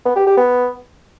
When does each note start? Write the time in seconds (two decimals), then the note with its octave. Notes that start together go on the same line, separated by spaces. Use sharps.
0.05 B3
0.16 G4
0.27 G4
0.37 B3